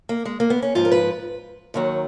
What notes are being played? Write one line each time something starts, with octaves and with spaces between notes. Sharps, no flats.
A#3
G#3
A#3
B3
C#4
G#2 F3 F4
A#4
B4
D#2 D#3 F#3